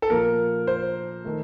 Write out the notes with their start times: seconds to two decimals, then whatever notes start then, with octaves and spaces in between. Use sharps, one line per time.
0.02 A4
0.10 A#2 F3 A#3 A#4
0.67 C5
1.25 D#3 A3